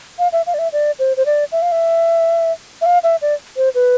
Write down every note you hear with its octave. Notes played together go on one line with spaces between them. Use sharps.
F5
E5
F5
D5
E5
D5
C5
C5
D5
E5
F5
E5
E5
F5
E5
D5
C5
B4